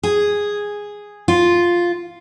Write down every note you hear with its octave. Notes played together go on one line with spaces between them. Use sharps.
G#4
F4